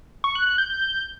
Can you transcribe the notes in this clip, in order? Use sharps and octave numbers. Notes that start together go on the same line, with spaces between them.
C#6
F#6
F#6
G6